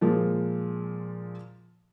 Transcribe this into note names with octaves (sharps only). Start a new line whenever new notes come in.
A#2 F3 G#3